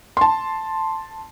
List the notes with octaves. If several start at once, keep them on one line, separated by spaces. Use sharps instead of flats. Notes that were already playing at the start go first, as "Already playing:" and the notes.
A5 C6